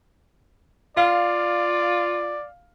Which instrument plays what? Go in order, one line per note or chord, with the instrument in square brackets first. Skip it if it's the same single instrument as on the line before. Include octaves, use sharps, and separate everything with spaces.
[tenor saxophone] F4 [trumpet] D5 [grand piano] F5